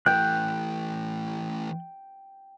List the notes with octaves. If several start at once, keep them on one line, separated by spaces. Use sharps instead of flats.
E3 A3 G5 F#6 G6